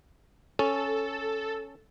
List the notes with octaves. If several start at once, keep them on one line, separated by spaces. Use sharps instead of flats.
C#4 A4